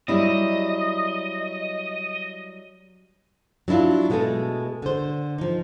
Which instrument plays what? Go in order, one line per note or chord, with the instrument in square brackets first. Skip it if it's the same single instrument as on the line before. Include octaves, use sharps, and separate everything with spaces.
[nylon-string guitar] F#3 G3 E4 [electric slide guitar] D#5
[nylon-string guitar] F#3 D4 E4 F4
B2 G#3 A3 G#4 A4
D3 C5
F3 D#4